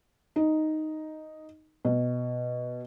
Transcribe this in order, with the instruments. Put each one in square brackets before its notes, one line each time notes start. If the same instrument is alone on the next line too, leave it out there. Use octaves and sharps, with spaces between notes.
[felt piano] D#4
B2